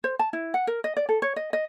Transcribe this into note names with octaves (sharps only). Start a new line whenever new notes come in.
C5
A5
E4
F#5
A#4
D#5
D5
A4
C#5
D#5
D#5